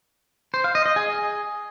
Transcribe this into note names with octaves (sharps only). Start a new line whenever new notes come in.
C5
F5
D#5
D#5
G#4